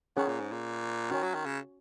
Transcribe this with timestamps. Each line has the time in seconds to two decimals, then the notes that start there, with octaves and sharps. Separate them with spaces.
0.17 D#3 C#4 G#4 C#5 F#5
0.28 A#2
0.40 G#2
0.52 A#2
1.11 D#3 C#4 F#4 C#5 G#5
1.23 F#3
1.34 D#3
1.46 C#3